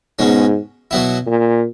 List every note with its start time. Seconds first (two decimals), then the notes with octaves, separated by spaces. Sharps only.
0.19 G#2 B2 G#3 C#4
0.91 B2 F#3 B3 E4
1.27 A#2